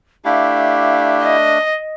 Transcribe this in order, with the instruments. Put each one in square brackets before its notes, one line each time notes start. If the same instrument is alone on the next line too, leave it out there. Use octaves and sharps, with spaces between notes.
[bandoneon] A3 D4 [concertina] E4 G4 [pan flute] F5
[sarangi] D#5